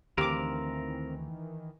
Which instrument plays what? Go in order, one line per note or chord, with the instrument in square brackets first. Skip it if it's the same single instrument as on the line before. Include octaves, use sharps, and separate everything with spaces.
[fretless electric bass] D2 [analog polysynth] D#3 E3 [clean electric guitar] C4 A#4 F5 [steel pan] G4 D6